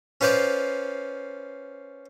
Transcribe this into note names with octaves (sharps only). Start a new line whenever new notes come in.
C#4 F4 B4 C5 D5